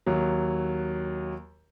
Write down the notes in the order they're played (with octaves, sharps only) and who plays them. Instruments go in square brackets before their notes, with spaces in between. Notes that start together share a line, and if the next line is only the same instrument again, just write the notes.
[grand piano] D#2 F#3